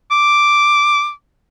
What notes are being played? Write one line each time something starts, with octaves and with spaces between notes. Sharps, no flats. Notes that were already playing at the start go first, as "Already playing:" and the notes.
D6